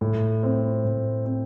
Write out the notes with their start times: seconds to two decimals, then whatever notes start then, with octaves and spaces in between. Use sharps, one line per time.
0.01 A2
0.43 C4
0.85 A2
1.26 C4